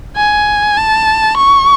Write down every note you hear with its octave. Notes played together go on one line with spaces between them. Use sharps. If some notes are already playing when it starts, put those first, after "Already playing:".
G#5
A5
C#6